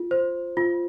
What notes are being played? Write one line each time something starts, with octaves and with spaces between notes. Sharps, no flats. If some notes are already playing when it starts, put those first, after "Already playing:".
Already playing: F4
C5
F4